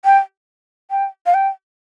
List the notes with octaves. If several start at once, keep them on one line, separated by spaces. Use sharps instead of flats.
G5
G5
F5
G5